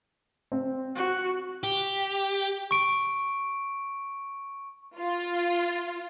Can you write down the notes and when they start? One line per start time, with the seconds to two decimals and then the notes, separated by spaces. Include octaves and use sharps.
0.52 C4
0.95 F#4
1.63 G4
2.71 C#6 D7
4.99 F4